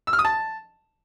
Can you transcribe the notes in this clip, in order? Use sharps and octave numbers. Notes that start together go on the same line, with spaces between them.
E6
F6
D#6
A5